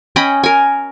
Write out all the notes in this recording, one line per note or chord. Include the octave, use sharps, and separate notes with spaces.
C#4 D#5 G5 B5
A#4 G#5